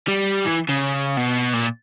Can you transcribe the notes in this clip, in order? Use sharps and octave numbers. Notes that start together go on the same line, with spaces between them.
G3
E3
C#3
B2
A#2